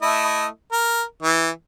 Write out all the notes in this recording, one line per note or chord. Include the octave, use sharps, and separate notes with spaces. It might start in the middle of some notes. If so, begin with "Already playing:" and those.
A3 E4 D#5
A#4
E3